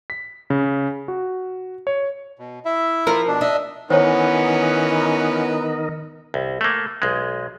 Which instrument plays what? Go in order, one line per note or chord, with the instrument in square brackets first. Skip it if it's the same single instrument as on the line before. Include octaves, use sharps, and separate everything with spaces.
[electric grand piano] B6
C#3
F#4
C#5
[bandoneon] B2
E4 E5
[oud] F3 A#4
[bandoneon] B2 D4
[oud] D4 [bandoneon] D#5 E5
[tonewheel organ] D#3 A#4 D#5 [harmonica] E3 C#4 [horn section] B3 [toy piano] C5 C#5
[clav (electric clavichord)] C2
A3 A#3
B1 G#3